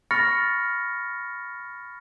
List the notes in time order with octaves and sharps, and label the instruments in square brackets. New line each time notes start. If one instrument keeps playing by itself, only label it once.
[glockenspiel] B5 C#6 F6 A6 A#6 C#7